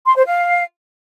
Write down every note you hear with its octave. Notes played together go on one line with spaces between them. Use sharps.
C6
C5
F5